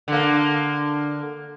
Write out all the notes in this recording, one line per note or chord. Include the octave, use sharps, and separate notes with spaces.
D3 A#3